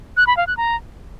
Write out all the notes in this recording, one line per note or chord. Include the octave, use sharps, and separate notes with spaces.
F#6
B5
F5
F#6
A#5